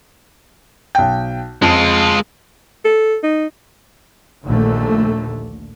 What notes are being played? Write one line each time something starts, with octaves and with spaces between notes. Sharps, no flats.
B1 G5
F2 G#3 F4
A4
D#4
A#1 D#2 D3 A3